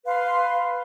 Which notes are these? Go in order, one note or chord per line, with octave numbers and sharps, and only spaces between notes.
B4 F5 C6